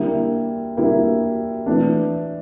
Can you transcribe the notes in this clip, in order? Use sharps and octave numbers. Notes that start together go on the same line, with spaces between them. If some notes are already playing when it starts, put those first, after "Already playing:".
Already playing: D3 G3 A#3 E4
D3 G3 A#3 E4
E3 A3 D4